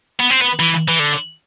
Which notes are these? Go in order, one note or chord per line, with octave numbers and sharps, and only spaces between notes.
B3
C4
B3
E3
E3
D3